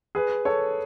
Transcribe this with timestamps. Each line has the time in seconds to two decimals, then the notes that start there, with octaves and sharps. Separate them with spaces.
0.15 G#4 B4
0.45 A4 C#5